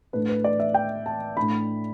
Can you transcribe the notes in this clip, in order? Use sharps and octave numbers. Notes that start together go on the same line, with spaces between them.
A2 A3 D4 B4
B4
D5
E5
G5
A5
A2 A3 D4 B5